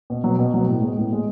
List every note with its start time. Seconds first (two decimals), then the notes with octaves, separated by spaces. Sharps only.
0.10 B2
0.24 F#3 B3
0.39 B2
0.54 F#3 B3
0.68 A2
0.82 G#3 B3
0.97 A2
1.12 G#3 B3